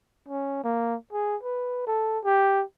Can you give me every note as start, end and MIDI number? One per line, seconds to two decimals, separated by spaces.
0.28 0.60 61
0.64 0.96 58
1.12 1.36 68
1.43 1.84 71
1.87 2.19 69
2.24 2.63 67